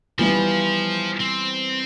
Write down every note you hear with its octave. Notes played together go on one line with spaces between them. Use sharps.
E3 F3 G3 B3 F4 B4
C4